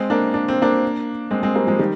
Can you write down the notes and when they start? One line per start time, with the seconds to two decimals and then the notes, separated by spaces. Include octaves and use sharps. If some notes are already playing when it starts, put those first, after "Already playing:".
Already playing: G#3 C4
0.10 A#3 D4
0.34 D4
0.48 C4
0.62 A#3 D4
1.31 G#3 C4
1.43 G#3 C4
1.55 G3 A#3
1.67 F3 G#3
1.79 D#3 G3